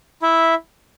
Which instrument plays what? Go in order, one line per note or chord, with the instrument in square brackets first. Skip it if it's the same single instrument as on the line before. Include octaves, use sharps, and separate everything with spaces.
[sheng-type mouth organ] E4 E5